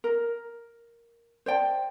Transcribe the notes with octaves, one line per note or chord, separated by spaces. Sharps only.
A#4
C5 D5 G5 A5